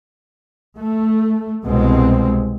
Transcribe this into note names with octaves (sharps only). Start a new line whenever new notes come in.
A3
C2 B2 G#3 C4